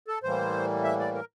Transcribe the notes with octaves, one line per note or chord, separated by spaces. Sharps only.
A4
A2 E3 G3 A#3 C5
E5
D5
A#4